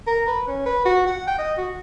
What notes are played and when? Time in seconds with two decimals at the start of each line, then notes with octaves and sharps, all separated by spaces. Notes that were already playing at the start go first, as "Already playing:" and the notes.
0.07 A#4
0.27 B4
0.47 C#4
0.66 B4
0.85 F#4
1.07 F#5
1.27 G5
1.39 D#5
1.58 F#4